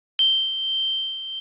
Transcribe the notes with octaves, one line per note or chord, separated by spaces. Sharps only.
G7